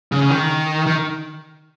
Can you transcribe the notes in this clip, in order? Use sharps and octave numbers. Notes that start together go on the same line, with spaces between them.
C#3
D#3
D#3